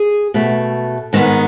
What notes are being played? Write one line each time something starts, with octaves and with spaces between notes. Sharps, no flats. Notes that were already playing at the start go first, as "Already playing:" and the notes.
Already playing: G#4
B2 A3
G#2 D#3 G#3 B3